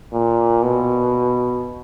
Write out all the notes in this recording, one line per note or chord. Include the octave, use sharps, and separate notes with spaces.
A#2
B2